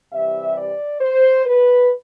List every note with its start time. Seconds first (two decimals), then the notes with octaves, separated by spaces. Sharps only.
0.13 C3 E3 G3 E5
0.57 D5
1.01 C5
1.46 B4